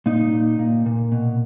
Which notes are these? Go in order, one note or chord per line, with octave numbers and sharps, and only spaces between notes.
A#2 D#4
A#2
A#2
A#2
B2